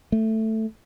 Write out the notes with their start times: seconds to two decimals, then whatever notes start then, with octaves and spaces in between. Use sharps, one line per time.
0.12 A3